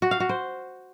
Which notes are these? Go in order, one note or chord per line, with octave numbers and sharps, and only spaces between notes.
F#4
F5
F#4
C5